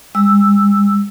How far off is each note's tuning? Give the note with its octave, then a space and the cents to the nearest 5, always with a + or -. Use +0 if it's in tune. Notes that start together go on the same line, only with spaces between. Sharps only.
G#3 -45 E6 +0